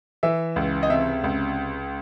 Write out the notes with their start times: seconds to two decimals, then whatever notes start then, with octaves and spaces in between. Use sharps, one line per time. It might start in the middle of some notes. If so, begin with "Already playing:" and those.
0.23 E3 E5
0.56 C#2
0.83 D#5
0.89 C3 E5
1.24 C#2